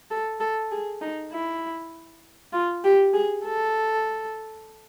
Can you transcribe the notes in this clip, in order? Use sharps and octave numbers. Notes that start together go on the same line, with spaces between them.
A4
A4
G#4
D#4
E4
F4
G4
G#4
A4